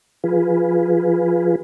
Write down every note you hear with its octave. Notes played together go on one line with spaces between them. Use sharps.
F3 F4 G#4 B4